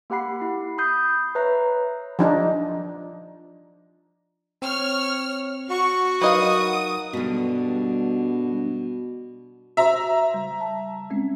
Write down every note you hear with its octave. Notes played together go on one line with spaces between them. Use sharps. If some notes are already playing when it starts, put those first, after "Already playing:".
A#3 G4 F#5 B5 C7
E4
B5 D#6 G6 C7
B4 C#5 E5 A#5
F3 D4 D#4
C4 C#5 F6
F#4 C#6
F#3 D#4 A#4 B4 D#5 F5 D#6
G2 B2 D3
F#4 C5 E5 A#5 C6
C#3 G3
A5
G#3 C4 C#4